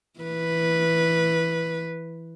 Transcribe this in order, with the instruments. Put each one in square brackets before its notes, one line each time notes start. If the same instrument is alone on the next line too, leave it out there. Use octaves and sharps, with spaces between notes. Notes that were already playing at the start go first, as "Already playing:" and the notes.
[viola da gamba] E3 B4